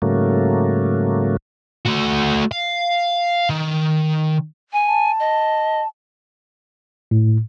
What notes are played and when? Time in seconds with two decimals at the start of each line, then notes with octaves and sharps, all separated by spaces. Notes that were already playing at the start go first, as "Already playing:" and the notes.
0.02 G#2 C#3 F#3 A3 A#3
1.86 A3 F#4
2.51 F5
3.50 D#3
4.73 G#5
4.88 A5
5.20 D#5
7.11 A2